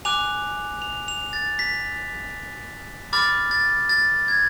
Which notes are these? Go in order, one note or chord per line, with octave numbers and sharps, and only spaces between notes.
G#5 D6 F#6 F7
F7
F7
A6
B6
B5 D6 F6 A6
A6
A6
G#6